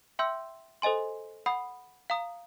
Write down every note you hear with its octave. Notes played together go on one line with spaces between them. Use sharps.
E5 G5 C6 E6 G6
A4 C5 D#5 G#5 C6
F#5 B5 D#6
F5 A#5 D#6